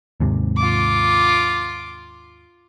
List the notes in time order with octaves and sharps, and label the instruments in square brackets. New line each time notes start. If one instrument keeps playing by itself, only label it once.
[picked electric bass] D#2 G#2 C3
[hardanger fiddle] F4 D6